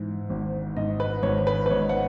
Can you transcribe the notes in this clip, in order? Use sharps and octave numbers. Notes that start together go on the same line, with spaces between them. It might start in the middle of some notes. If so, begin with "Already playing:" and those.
Already playing: G#2 E3
G#1
G#2 D#5
B4
G#1 C#5
B4
B4
G#1 C#5
F#5